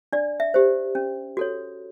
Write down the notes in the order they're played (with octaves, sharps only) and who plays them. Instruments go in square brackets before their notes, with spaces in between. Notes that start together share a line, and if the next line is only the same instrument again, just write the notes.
[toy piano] D4 D5
E5
G4 C5
C#4
F#4 A4 C#5